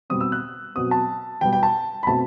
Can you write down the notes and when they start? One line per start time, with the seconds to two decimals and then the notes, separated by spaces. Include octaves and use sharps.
0.10 B2 G3 C4 D#6
0.21 E6
0.32 F#6
0.75 B2 F#3 C4 D#6
0.91 A5
1.41 B2 G3 B3 G5
1.53 G5
1.63 A5
2.03 B5
2.07 B2 A3 C4 A5